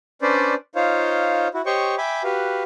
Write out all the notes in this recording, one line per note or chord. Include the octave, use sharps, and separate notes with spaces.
C#4 D4 B4 C5 D5
D#4 F4 C5 C#5 F5
E4 F#4
G4 C5 C#5 D#5 G5 C#6
E5 G5 G#5 B5 D6
F#4 G4 B4 F5